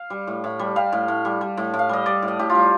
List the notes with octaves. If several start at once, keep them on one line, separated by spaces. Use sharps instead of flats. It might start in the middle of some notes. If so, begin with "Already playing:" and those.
Already playing: F5
G3
A2
A2
G3
G3 F5
A2
A2
G3
G3
A2
A2
F5
G3 D#5
G3 D5
A2
D#5
A2 G4
F4
G3